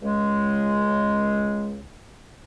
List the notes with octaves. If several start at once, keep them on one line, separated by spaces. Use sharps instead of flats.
C#2 G#3